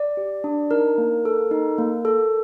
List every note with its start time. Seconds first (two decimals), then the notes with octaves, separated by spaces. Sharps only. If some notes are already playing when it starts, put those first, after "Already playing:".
Already playing: D5
0.17 G4
0.44 D4
0.71 D#4 A#4
0.98 A#3
1.25 A4
1.51 D#4
1.78 A#3
2.05 A4